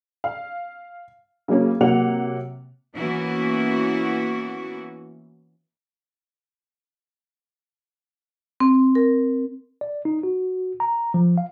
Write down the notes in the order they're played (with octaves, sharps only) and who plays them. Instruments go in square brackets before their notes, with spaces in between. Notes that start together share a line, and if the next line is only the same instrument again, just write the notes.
[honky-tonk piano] F5
C#3 F#3 A#3 C#4
C3 F#3 A#3 F#5 F7
[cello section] E3 A#3 B3 C#4 E4 F#4
[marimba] C4
A#4
[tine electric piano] D5
D#4
F#4
A#5
F3
F5